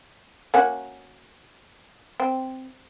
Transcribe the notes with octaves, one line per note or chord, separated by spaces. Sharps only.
A#3 C#4 F#4
C4